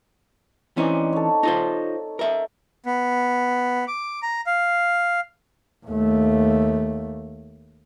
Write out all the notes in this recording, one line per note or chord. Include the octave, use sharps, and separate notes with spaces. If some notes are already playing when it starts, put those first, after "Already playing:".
E3 C4 C#4 D#4 D5
A4 C#5
D#4 F4 C5
A#4 E5
B3
D6
A#5
F5
D#2 A3